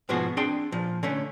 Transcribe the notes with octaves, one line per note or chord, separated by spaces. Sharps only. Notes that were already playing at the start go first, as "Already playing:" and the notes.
G#2 B2 F3 B3 F#4 G#4
C4 D4 G#4 G5 C6
A#2 F3
D3 A3 C#4